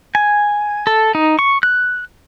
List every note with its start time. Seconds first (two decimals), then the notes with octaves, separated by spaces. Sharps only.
0.15 G#5
0.87 A4
1.15 D#4
1.39 C#6
1.63 F#6